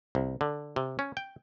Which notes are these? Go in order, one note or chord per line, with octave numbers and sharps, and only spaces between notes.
C2
D3
C3
C#4
G5